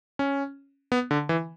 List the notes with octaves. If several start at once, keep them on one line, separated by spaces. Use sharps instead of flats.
C#4
B3
D3
E3